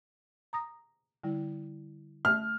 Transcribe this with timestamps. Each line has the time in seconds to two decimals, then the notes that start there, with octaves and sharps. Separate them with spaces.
0.53 A#5 D#6 A#6
1.24 D3 G3 E4
2.25 A3 E5 F6